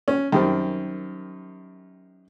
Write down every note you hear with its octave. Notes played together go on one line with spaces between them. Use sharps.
C#4
F#2 D#3 G3 C4